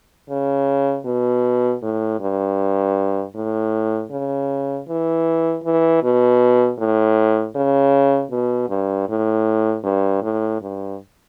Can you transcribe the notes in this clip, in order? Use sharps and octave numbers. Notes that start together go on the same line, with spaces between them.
C#3
B2
A2
G2
A2
C#3
E3
E3
B2
A2
C#3
B2
G2
A2
G2
A2
G2